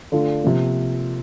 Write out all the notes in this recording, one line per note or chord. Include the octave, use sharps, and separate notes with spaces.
D3 A3 D4 F4
C3 F3 A#3